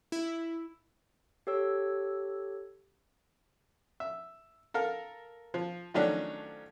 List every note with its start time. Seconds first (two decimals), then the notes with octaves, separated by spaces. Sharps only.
0.12 E4
1.47 G4 A4 C#5 E6
4.00 E5
4.74 A4 A#4 F5
5.54 F3
5.94 D#3 F3 F#3 A3 C#4 D4